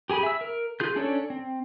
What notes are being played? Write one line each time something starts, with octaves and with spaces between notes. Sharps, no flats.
G4 G#4 G#5 B5
E5 E6
A#4
F4 G#4 G6
C#4 D4 A4 C#5 D5
C4